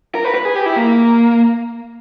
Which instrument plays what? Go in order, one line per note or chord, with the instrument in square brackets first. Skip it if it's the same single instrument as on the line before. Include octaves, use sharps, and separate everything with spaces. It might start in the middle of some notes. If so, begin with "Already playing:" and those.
[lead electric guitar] A#4
B4
B4
G#4
G4
E4
A#3